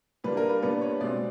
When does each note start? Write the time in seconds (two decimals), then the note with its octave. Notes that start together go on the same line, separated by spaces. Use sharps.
0.24 A#2 G3 A#3 D4 B4
0.37 A#4
0.49 B4
0.62 A#2 G3 B3 D4 B4
0.81 C#5
1.01 B2 G#3 C4 D5